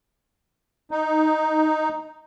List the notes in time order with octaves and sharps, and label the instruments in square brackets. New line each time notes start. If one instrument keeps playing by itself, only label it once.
[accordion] D#4